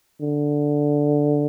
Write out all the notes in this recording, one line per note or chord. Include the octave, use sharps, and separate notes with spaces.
D3